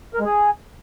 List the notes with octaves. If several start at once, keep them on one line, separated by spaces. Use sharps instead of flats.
A#4
G#3
G#4